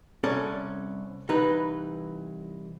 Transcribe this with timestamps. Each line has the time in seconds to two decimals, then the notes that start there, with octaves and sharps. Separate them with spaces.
0.24 C2 C#4 A4 D5
1.29 C2 E3 D#4 B4